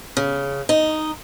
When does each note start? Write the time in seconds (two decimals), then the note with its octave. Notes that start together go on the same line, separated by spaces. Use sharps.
0.17 C#3
0.69 D#4